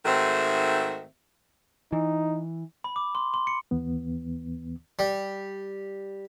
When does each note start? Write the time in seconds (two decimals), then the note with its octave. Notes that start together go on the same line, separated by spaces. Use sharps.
0.05 G#2 D#3 A3 C4 F#4 E5
1.92 E3 D#4
2.84 B5
2.96 D6
3.15 C6
3.34 C6
3.47 C#7
3.71 D#2 E3 B3
4.99 G3